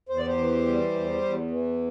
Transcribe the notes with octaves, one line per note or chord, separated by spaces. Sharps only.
E2 C5
D5
G4 C5
E3
G3
E2
E2
E3